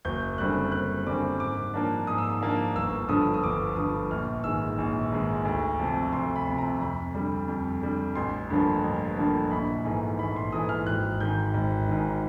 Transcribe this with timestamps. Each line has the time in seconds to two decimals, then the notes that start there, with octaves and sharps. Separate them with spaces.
0.05 F#1 G6
0.38 F#2 D3 G3 C4 F#6
0.72 F#1 F#6
1.07 F#2 D3 G3 C4 D6
1.40 G#2 D6
1.74 F3 A#3 D4
2.07 G#2 D#6
2.18 E6
2.30 D#6
2.42 F3 A#3 D4
2.76 G1 E6
3.08 G2 D3 F3 D#6
3.34 D#6
3.43 G1 D6
3.76 G2 D3 F3 D#6
4.11 A#1 F6
4.44 G#2 D#3 G#3 E6
4.78 A#1
5.12 G#2 D#3 G#3
5.45 D2
5.80 C3 F3
6.13 D2 C6
6.36 B5
6.47 C3 F3
6.58 A#5
6.81 F2 B5
7.15 D3 G3
7.48 F2
7.82 D3 G3
8.15 A1 C6
8.50 G2 D3 F3 A#3
8.84 A1
9.17 G2 D3 F3 A#3
9.51 A#1 B5
9.85 G#2 E3 A3
10.19 A#1 B5
10.36 C6
10.52 G#2 E3 A3 D#6
10.69 F6
10.87 G#1 F#6
11.20 G#2 D#3 G6
11.54 G#1
11.88 G#2 D#3